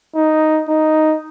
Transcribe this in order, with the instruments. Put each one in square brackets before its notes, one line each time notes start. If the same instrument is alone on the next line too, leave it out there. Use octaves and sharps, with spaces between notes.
[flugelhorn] D#4
D#4